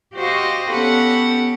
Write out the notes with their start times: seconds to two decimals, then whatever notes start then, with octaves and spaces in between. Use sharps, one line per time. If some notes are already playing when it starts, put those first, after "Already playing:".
0.15 F#4 G4 C5 D#5 F5
0.70 B3 C#4 G4 A4 F#5 B5